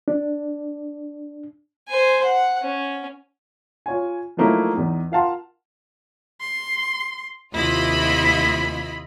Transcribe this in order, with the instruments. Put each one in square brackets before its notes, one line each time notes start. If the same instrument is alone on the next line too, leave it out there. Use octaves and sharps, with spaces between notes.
[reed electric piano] D4
[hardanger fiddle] C5 G#5
F#5
C#4
[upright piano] F4 C#5 G#5
F3 F#3 A3 A#3 D#4 E4
E2 D#4
F4 A#4 F5 F#5 A5 C6
[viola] C6
[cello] D#2 C3 [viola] E4 [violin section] F4 D#5 B5